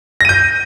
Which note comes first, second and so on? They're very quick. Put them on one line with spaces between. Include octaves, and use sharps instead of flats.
A#6 D#7 G6